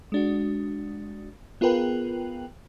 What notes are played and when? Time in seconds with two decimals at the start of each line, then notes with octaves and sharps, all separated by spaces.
0.12 G#3 D4 F#4
1.61 B3 F4 G#4 A#4 B4 G5